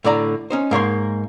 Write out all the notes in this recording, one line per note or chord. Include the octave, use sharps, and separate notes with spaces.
A2 D3 D5 A#5
C#4 D#4 C5
G#2 A#3 C#5 C6